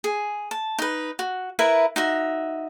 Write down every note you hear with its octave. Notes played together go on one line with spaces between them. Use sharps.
G#4
A5
D#4 B4
F#4
E4 A#4 B4 E5
D#4 F#4 E5